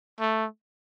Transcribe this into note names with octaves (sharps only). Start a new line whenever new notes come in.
A3